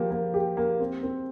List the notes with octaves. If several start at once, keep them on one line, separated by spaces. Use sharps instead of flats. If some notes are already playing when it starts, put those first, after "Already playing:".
Already playing: F3 A#3 G4
A#3
G4
A#3
C4
C4